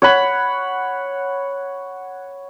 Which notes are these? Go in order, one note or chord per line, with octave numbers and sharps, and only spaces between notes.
C#5 F#5 B5